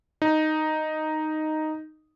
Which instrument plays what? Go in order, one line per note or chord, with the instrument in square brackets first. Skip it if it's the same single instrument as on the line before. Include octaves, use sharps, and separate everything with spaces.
[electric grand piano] D#4